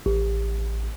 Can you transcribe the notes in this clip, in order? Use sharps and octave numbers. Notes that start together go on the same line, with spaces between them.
A1